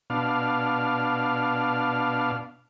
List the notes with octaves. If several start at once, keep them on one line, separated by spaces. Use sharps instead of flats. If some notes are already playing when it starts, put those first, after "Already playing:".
B2 D4 F5